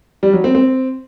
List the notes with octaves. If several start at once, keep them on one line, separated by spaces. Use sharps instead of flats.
G3
F#3
C4
C4